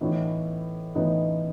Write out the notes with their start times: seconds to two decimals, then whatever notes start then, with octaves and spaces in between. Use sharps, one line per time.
0.01 A2 E3 B3 D#4
0.95 A2 E3 B3 D#4